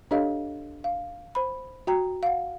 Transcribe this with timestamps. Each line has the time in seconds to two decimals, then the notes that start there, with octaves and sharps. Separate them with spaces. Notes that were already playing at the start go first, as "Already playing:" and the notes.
0.11 D4 G4 A4 C#5 D#5 F5
0.84 F5
1.35 C5 B5
1.87 F#4 G5 A#5
2.23 F5 F#5